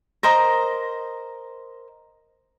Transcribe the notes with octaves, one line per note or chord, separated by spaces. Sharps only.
A#4 C5 D#5 A#5